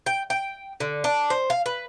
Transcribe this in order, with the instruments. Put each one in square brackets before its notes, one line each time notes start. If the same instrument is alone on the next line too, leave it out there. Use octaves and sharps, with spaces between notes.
[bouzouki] G5
G5
D3
D4
C5
F5
B4